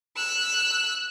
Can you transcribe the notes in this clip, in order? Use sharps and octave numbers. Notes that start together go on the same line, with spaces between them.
E6 F#6